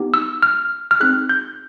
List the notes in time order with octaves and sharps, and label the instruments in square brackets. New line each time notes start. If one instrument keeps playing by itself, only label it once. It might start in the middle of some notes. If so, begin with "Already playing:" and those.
Already playing: [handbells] B3 D#4 G4
E6
F6
F6
C4 D#4 G#4 F#6
G6